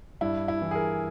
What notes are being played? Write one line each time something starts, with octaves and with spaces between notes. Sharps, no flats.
G2 E4
E4
E3
G#4
A#4